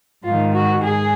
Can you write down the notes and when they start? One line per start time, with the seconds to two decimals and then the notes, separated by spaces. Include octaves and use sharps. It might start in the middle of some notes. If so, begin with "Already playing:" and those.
0.24 G#2 D#3 F4
0.53 F#4
0.82 G#2 G#4